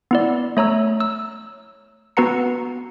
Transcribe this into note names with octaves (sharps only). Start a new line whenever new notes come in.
B3 E4 D5
A3 C#5 A#5 E6
E6
B3 F#4 B4 F#5 A#5 C#7